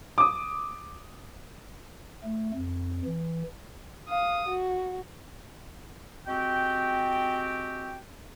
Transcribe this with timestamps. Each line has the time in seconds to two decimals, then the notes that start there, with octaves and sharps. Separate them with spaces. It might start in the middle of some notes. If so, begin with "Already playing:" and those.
0.18 D6 D#6
2.24 A3
2.54 F2
3.05 E3
4.08 F5 D#6
4.48 F#4
6.27 G#3 C4 F#4 G4 G5